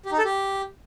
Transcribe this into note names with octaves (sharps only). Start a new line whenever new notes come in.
G4
D#4
A4
G4